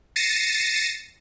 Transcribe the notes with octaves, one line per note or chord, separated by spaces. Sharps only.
A6 A#6 C7 C#7 D#7 E7